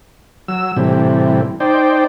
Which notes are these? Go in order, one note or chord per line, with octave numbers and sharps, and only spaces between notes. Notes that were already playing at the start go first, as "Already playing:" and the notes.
F#3 E6
A2 C3 E3 G3
D#4 C5 D5 G5